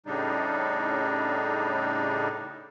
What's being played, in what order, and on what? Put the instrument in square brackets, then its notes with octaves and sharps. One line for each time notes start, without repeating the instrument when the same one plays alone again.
[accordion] A2 C#3 G3 D4 D#4